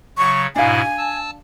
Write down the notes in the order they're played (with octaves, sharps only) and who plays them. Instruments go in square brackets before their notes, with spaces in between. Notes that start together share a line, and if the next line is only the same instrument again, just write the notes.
[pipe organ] C#3 F#3 [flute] C#6
[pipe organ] G#2 B2 E4 [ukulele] D4 F5 [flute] G#5
[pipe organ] A5 E6